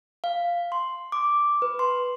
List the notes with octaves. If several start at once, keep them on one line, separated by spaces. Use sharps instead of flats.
F5
C6
D6
B4
C6